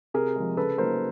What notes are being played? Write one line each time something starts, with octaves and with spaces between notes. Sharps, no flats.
C3 G#4 A#4
F3 G#3
C#3 A4 B4
F#3 A#3 D#4 A#4 C5